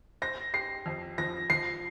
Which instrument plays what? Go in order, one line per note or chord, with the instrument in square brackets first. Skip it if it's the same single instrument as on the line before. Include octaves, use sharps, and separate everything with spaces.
[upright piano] C5 [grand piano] A#6
[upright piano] G4 [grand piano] C7
[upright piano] F2
[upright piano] F3 [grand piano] A#6
[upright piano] F3 [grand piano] C7